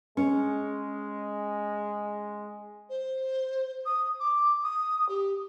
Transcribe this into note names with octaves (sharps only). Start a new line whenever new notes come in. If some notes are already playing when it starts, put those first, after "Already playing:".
G#3 C#4
C5
D#6
D6
D#6
G4